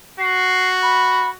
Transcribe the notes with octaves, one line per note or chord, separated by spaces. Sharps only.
F#4 C7
B5